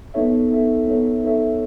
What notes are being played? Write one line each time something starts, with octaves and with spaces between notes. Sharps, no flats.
B3 D#4 A4 C#5 E5
B3 D#4 A4 C#5 E5
B3 D#4 A4 C#5 E5
B3 D#4 A4 C#5 E5